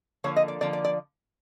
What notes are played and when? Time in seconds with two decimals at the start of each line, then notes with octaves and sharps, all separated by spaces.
0.24 D3 F3 A#3 C#5
0.36 D#5
0.48 D5
0.61 D3 F3 A#3 D5
0.73 D5
0.85 D5